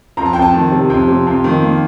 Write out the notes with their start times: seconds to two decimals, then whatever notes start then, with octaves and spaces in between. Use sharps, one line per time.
0.17 F2 A#5
0.25 A5
0.33 F2 G5
0.42 A5
0.54 D#3
0.72 C3
0.90 F2
1.08 C3
1.27 F2
1.44 D#3
1.63 A#3